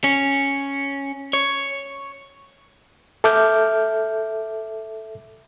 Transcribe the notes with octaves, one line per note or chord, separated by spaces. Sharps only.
C#4
C#5
A4 E5 D6 F6 G6